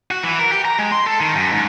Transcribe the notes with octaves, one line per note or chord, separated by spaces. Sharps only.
F#4
E3
A#4
G4
A#5
G#3
C6
A4
D#3
F#2
G#2